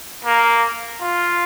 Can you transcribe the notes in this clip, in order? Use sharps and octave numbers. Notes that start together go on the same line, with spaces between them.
A#3
F4